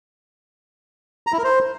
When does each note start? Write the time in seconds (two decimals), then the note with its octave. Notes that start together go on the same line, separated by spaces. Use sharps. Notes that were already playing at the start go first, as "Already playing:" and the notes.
1.27 A#5
1.33 E4
1.38 A#4
1.44 C5